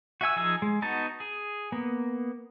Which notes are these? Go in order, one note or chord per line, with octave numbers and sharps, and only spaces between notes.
F#4 E5 G#5 E6
F3 D#4 G#4 E6
G#3
B3 D#4 F#4 A5
G#4
A#3 B3